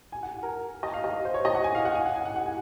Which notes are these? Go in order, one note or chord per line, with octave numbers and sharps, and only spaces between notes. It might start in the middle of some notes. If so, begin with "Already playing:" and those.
G#5
F#5
A#4
D#5
F5
D#5
C5
C#5
D#5
F#5
G#5
F5
F#5
G#5
F#5
G#5
F#5
F#5
G#5